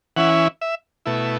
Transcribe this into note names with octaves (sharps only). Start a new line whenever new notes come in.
E3 C#4 E4 F#5
E5
B2 A3 E4